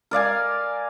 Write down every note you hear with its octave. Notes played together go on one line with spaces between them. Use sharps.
A#4 D5 F5 G#5